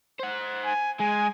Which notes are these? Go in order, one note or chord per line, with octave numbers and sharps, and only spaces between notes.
C5 F#5
G#5
G#3 G#5